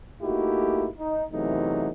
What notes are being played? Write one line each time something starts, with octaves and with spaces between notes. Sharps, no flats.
A3 A#3 D#4 E4 F#4 G4
D#4
E2 C3 E3 F#3 A3 D#4